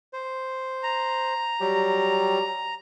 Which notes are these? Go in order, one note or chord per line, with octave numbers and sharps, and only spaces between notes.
C5
A#5
F#3 G3 G4